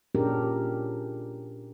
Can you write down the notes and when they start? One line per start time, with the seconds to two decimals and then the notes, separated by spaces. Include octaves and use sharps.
0.15 A#2 C#4 D4 G4 G#4 A#4